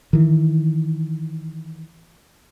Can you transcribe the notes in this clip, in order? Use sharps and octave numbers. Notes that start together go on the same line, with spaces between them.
D#3 E3